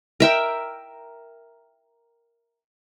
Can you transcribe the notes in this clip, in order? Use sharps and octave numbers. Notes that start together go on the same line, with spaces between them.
A#4 E5 G5